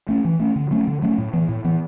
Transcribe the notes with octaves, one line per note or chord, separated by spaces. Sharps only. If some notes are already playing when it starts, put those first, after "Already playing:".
A3 C#4
E3
A3 C#4
D3
F#3 A3 C#4
D3
F#3 A3 C#4
A2
E3 B3
A2
E3 B3